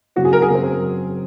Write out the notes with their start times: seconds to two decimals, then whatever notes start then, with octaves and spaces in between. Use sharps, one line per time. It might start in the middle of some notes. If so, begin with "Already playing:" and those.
0.16 C#3 F#3 C4 F#4
0.25 G#4
0.33 A#4
0.42 G#4
0.50 C#3 F#3 C4